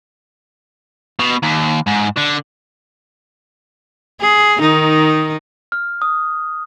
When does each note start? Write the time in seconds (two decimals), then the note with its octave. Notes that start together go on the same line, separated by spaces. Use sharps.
1.20 B2
1.43 D#2
1.88 G#2
2.18 D3
4.21 G#4
4.58 D#3 D#4
5.72 F6
6.02 D#6